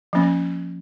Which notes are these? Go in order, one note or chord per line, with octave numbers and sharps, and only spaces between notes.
F3 A#3 C#4